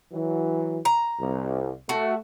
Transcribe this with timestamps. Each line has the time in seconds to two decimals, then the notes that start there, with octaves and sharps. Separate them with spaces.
0.13 E3 F#3
0.85 A#5
1.20 C2
1.89 A3 F#4